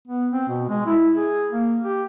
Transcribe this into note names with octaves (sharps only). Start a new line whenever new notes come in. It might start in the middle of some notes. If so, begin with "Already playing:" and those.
B3
C4
B2
G#3
E4
G#4
A#3
G4